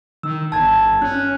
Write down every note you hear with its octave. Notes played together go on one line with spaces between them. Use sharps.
D#3 E6
G1 A5 G#6
C#4 F#6